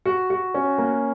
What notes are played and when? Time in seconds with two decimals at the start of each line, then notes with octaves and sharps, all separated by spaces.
0.05 F#4
0.30 F#4
0.54 C#4
0.78 A#3